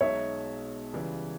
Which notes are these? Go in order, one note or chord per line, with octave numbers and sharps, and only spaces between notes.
B1 B2 G#3 D#4 C#5 E5
C#2 C#3 E3 G3